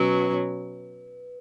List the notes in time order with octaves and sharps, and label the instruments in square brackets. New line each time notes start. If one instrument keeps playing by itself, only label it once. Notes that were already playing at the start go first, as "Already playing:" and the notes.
Already playing: [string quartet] B2 F#3 C#4 [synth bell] B4